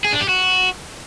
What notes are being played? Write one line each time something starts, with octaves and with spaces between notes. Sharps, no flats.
G#4
D4
G4
F#4